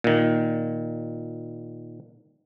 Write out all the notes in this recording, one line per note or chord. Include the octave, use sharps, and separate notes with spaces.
A#2 D#3